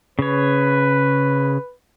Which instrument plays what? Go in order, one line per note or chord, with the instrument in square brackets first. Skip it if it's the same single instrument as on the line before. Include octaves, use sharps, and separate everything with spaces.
[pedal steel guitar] C#3 C#5 [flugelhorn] B4